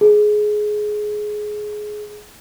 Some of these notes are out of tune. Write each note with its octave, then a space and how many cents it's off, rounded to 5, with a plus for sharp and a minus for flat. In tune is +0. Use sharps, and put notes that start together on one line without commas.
G#4 +15